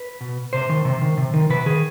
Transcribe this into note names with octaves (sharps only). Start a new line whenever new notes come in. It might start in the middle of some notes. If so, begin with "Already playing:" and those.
Already playing: B4
B2
C3 C5
D#3
C3
D#3
C3
D#3
C3 B4
D#3 G#4